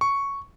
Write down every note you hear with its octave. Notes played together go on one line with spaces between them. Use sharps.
C#6